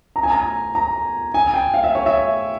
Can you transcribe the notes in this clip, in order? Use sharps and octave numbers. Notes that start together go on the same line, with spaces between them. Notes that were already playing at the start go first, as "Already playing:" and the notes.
A#5
G#5
A#5
A#5
G#5
G5
F5
E5
C#5
E5